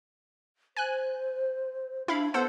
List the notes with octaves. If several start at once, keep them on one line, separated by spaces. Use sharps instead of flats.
C5 G#5 F#6
D4 E4 F5 B5
B3 A4 C5 F#5